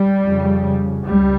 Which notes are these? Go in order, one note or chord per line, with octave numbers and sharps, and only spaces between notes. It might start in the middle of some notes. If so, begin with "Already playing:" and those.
Already playing: G3
F2 C#3
C#2 G3